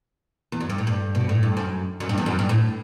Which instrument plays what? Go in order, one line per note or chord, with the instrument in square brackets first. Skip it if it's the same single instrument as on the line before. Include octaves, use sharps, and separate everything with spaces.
[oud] E2
F#2
G2
A2
G2
B2
A2
G2
F#2
F#2
G2
E2
F#2
G2
A2